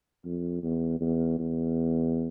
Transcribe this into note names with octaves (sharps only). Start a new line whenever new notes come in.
F2
E2
E2
E2